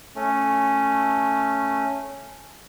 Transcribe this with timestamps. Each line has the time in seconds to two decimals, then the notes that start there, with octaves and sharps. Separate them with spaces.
0.16 A3 C#4